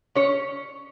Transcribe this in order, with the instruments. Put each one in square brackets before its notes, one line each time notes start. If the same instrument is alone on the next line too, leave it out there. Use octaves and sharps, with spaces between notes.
[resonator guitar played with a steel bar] C#4 C#5